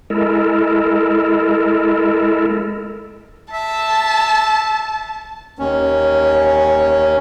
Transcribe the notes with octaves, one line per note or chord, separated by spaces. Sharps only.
G#3 E4 A4 A#4
E5 A5
D#2 C#4